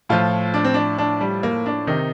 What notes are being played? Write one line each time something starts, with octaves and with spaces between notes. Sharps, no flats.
A2 F3 F4
D4
C4
D4
D4
G3
A#3
D4
C3 D#3 D#4